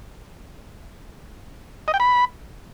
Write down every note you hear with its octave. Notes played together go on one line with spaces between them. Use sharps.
D#5
G5
B5